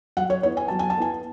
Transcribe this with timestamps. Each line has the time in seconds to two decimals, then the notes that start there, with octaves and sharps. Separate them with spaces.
0.17 F#3 F#5
0.30 C#5
0.43 B3 E4 C#5
0.57 G#5
0.68 F#3 A5
0.79 G#5
0.90 A5
0.98 B3 E4 G#5